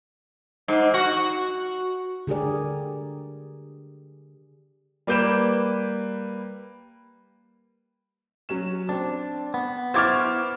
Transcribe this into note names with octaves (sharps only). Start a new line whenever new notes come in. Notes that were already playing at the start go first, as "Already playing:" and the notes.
G#2
F#4
D3 G4 G#4 A#4 D5
G3 A#3 B4 G6 D7 E7
F#3 C#4 E7
C4 D4
B3
E4 C5 C#6 D6 F6 G#6 A6